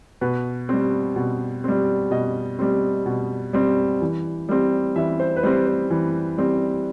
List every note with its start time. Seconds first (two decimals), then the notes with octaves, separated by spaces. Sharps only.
0.21 B2 B4
0.69 G3 C4
1.16 B2
1.64 G3 C4
2.11 B2 D#5
2.59 G3 C4
3.06 B2
3.53 G3 C4
4.01 E3
4.49 G3 C4
4.96 E3 E5
5.20 C5
5.36 B4
5.43 G3 C4 C5
5.67 C5
5.91 E3
6.38 G3 C4